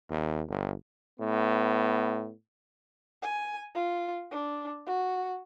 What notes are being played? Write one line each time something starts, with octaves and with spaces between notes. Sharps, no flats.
D#2
G1
A2 B3
G#5
F4
D4
F#4